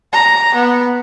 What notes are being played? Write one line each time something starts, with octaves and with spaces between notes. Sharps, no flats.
A#5
B3